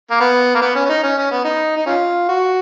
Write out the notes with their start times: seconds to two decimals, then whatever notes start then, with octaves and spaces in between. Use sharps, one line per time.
0.11 A#3
0.20 B3
0.55 A#3
0.61 B3
0.75 C#4
0.86 C#4
0.89 D#4
1.03 C#4
1.17 C#4
1.31 B3
1.45 D#4
1.77 D#4
1.87 C#4 F4
2.28 F#4